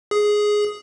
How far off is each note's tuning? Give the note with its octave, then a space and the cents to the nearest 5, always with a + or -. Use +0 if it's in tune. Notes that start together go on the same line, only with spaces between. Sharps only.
G#4 +5